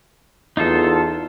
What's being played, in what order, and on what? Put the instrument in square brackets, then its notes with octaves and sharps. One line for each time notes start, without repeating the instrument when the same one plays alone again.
[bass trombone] E2 [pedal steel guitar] D#4 F4 A4